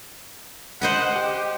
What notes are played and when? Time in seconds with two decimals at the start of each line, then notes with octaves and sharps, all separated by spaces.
0.81 C5 D#5 F#5 B5
1.12 G4